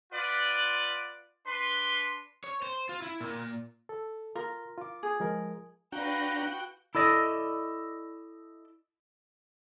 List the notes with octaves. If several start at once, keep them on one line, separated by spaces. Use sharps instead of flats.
F4 B4 D5 F#5
D4 B4 C6
C#5
C5
F4
E4
A#2
A4
F4 A#4 C6
F4 D6
G#4
F3 G#3 A#4
D4 F#4 B4 F5 G5 A#5
E4 A4 D5 D#5